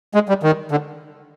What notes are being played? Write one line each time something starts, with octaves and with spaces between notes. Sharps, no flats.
G#3
G3
D#3
D3